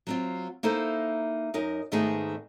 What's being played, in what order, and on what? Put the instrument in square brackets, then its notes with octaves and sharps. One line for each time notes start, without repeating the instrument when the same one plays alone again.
[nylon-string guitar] F#3 C4 F4
A#3 D#4 E4 A4 C5
F#2 D#4 A#4 D#5
G#2 D#3 A3 B3 D#4 G#4